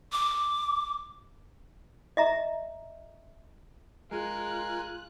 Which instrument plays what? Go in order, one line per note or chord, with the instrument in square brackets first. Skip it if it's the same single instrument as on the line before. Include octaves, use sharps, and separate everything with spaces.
[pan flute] D6
[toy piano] D#5 E5 A#5
[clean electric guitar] G#3 [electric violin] F4 F#6 [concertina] A#4 G#5